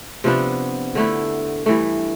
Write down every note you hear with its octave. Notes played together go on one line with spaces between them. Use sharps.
C3 F3 B3 D4
D3 A3 E4
G2 E3 A3